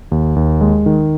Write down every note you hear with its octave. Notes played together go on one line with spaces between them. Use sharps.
D#2
D#2
G#3
D#3